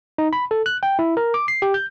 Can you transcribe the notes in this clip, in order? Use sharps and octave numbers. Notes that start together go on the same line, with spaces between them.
D#4
B5
A4
F#6
G5
E4
A#4
D6
C7
G4
G6